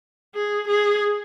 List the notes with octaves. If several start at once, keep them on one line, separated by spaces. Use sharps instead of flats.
G#4
G#4